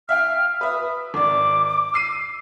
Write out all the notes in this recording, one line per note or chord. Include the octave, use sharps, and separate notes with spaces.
E5 F5 G5 F6
B4 E5 D#6
G#1 D5 D6
E6 C7 D#7